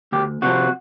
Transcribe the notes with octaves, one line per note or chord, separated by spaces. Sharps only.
D2 G4
C3 F3 F#4